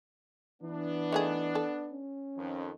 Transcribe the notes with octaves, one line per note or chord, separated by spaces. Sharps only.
E3 B3 D4
D#3 A3 G#4
A4
C#4
F2 D#3